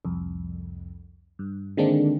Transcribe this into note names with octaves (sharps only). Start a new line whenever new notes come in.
C2 F2
G2
D3 D#3 G#3 A#3 C4 D4